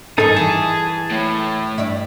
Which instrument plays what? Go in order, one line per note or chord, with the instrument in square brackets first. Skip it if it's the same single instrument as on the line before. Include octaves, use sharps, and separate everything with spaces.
[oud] G2 D#3 [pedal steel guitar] D#4 A4 [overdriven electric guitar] G#4
[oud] E3 [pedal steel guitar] A5
[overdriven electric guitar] A2
[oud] G2 D5 E5